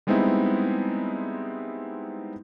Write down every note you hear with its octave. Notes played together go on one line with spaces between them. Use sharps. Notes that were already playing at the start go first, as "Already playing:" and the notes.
G3 G#3 B3 C4 D#4 E4